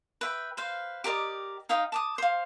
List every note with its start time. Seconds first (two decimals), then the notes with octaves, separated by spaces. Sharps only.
0.21 B4 E5 G5
0.57 B4 C5 F5
1.04 G4 A#4 D5 D#5
1.69 D#4 F5 G5 D#6
1.92 A5 D6 D#6
2.18 C5 F5